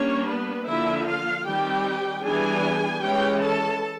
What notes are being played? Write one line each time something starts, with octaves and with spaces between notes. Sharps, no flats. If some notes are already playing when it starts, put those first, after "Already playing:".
Already playing: G3 A#3 C#4 D4 C#5
B3 B4
D3 F3 A#3 E4 E5
F4 F5
D#3 G3 C4 G4 G5
E3 G3 B3 D4 G#4 G#5
E3 G#3 C#4 G4 G5
A4 A5